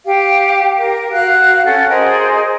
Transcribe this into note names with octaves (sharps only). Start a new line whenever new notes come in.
G4 F5
A#4
F#4 F5 F#6
C#4 A4 F#5
G#4 A#4 C5 D#5